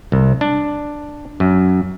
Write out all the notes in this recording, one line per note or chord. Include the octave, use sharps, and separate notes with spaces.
C2
D4
F#2